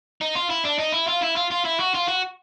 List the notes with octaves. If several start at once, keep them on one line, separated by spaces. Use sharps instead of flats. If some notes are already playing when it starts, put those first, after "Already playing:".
D#4
F4
E4
D4
D#4
E4
F4
E4
F4
F4
E4
F#4
F4
F#4